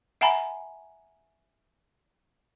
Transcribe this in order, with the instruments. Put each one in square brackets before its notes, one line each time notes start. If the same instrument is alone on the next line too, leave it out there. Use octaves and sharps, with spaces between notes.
[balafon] E5 F#5 G#5 A#5 B5